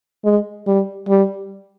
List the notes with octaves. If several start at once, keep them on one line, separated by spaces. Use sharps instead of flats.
G#3
G3
G3